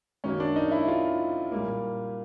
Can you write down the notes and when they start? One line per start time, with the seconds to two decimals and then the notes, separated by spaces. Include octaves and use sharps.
0.24 F#2 D#3 F#3 A#3 C#4
0.40 D4
0.56 D#4
0.71 E4
0.88 F4
1.52 A#2 G3 A#3